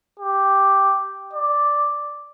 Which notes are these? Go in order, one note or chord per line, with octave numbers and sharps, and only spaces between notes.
G4
D5